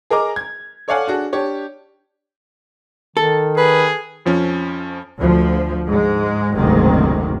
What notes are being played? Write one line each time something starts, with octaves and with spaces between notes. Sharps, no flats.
G#4 A#4 D#5 A#5 D6
G#6
A4 C#5 D5 F5 F#5 G#5
D4 F#4 G#4
D4 G4 C#5
D#3 A4
G#4 B4
F2 F3 C#4
D2 F3
G#2 G#3
F#1 D2 G#2 C3 D#3